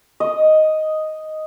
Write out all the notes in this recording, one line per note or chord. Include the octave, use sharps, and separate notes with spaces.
D#5